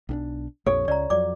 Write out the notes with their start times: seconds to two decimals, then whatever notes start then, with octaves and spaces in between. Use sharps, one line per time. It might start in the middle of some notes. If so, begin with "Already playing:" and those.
0.09 B1 C4 D4
0.66 A#1 F2 A4 C#5
0.88 C#2 D5 A#5
1.10 F2 F#3 D5 D6